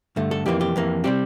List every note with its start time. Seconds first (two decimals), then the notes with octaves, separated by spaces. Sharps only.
0.16 G2 D3 A3
0.31 A4
0.46 F2 E3 A#3 G4
0.61 G4
0.76 F2 E3 A#3
1.04 C3 G3 C4 G4